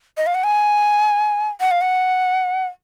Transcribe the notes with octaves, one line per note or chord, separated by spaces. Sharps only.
D#5
F5
F#5
G#5
F#5
F5
F#5